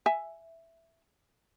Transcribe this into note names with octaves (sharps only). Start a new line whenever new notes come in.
E5 G#5